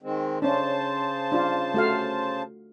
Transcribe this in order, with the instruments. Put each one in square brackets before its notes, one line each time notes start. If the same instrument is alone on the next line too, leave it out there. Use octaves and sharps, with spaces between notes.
[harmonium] D#3 G#3 C4
[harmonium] C#3 C5 A5 [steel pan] C#4 D4
[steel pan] D4 F4
A3 F#4 F5